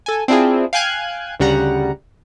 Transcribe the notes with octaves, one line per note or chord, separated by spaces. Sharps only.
A4 G#5
C4 D4 E4 F4 G#4
F5 G5 G#5 F#6 G#6
D2 C#3 G3 F#5 A#5